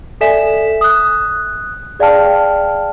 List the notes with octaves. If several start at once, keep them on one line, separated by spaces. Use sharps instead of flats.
A4 D5 E5 G#5 B6 E7
D#6 F#6
G#4 D5 F5 G5 A5 F6